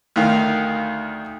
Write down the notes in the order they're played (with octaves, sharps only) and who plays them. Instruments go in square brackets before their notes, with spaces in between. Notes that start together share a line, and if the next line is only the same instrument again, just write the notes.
[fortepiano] D2 D#3 F5